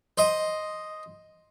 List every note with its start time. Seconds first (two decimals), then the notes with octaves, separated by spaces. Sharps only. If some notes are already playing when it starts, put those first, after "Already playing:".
0.18 C5 D#5